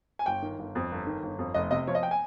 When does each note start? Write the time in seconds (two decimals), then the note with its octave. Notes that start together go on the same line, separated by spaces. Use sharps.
0.19 G#5
0.26 G1 G5
0.42 D#3
0.59 G1
0.75 F2
0.91 G1
1.07 D#3
1.23 G1
1.39 F2
1.54 F1 D#5
1.71 C3 D#5
1.87 F3 C#5
1.95 D#5
2.03 G5
2.11 G#5